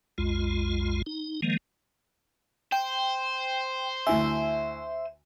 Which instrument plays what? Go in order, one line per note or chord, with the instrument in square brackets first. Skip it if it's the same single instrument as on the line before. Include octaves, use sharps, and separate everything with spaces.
[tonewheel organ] B1 F2 G#3 F4
D#4
D#3 F3 G#3 A#3
[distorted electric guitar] C5 [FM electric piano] G5
[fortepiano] D2 E4 G#5 [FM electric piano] E5